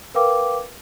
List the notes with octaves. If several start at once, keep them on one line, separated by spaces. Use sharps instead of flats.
A#4 B4 F5 G5 D6